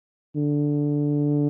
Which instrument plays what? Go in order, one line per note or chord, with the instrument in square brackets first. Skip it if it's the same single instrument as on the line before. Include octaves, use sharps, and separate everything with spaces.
[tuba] D3